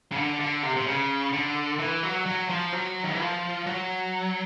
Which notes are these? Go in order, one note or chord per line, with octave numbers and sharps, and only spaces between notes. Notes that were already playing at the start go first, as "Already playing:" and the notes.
C#3
D3
D3
C3
C3
C#3
D3
E3
F#3
F#3
F3
F#3
D#3
E3
F3
F#3